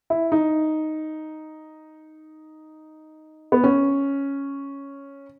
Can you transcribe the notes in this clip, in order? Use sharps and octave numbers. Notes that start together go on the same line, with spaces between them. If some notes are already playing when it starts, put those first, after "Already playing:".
E4
D#4
B3
C#4